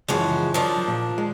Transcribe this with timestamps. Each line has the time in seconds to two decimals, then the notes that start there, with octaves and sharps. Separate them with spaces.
0.08 C#2 F#2 E3 F3 G#3 F#4
0.54 D#3 F3 F#3 D4
0.87 A#2
1.18 G#3